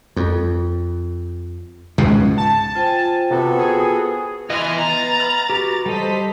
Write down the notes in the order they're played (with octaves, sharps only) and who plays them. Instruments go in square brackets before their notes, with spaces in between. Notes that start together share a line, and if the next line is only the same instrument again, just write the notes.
[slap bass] F2
C#2 G#2 B2
[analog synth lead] A5
[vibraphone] F4 C5 G5 [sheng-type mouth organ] G#5
[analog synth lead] C3 [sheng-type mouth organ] B3 F#4 A4
[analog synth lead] G#4
[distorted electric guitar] E3 [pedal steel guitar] B3 D#5 [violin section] G#5 C6 F6
[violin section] B4 A6 [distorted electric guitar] A#5
[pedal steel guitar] B5 F6
F#4 G4
[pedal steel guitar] G3 D#5 [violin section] A4 C5 B6